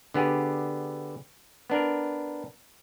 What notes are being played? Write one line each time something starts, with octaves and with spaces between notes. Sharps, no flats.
D3 B3 G4 G#4
B3 D4 A#4